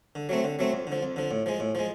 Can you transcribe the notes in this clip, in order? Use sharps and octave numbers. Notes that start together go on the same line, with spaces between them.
D3
F#3 A3 C4
D3
F#3 A3 C4
F2
D3
F3
F2
D3 F3
A2
F3 G#3
A2
F3 G#3